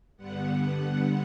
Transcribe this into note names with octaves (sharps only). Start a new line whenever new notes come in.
G2 D3 G3 B3 F#5